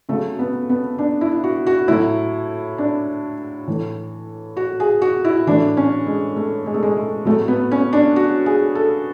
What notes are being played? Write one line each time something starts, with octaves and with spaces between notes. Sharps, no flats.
C#3 F#3 A3
B3
B3
D4
E4
F#4
F#4
A2 F#3 E4
D4
A2 E3
F#4
G#4
F#4
E4
A2 E3 D4
C#4
G#3
A3
G#3
A3
G#3
A3
A2 F#3 A3
B3
C#4
D4
F#4
G#4
A4